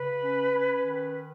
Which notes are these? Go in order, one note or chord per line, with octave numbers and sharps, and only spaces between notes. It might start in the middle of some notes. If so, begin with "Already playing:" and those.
Already playing: C#3 B4
C#4
C#4
D#3